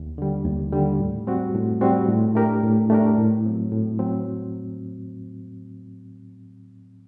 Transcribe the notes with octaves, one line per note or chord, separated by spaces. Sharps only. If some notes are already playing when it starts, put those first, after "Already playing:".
Already playing: D#2
D3 G3
D#2
D3 G3
A2
G3 C4 F#4
A2
G3 C4 F#4
A2
A3 D4 G4 A#4
A2
A3 D4 G4 A#4
A2
F#3 C4
A2
F#3 C4